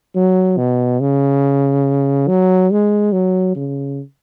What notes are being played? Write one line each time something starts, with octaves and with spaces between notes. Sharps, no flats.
F#3
B2
C#3
F#3
G#3
F#3
C#3